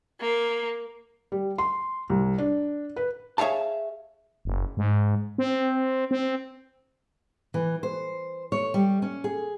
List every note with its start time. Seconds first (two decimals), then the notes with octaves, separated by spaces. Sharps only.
0.21 A#3
1.32 G3
1.58 C6
2.10 C2
2.38 D4
2.96 B4
3.38 G#4 C#5 E5 F5 A5
4.45 F#1
4.77 G#2
5.38 C4
6.11 C4
7.54 E3
7.83 C5
8.52 C#5
8.74 G3
9.02 C#4
9.24 G#4